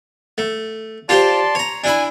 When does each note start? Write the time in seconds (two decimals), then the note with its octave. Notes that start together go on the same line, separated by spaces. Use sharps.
0.38 A3
1.09 F4 G4 C5 D5 A5 C6
1.55 C#5 A#5
1.84 D4 E4 G#5 B5